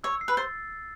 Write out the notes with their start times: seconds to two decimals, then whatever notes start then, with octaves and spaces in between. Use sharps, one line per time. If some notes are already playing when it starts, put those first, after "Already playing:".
0.04 C#5 E6
0.21 C7
0.28 B4
0.37 C5 A6